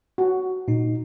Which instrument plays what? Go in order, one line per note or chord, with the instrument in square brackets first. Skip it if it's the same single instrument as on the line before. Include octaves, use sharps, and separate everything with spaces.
[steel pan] F#4
[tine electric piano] A#2 D#4